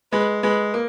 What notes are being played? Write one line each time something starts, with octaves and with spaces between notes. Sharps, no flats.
G#3 B4
G#3 B4
A#3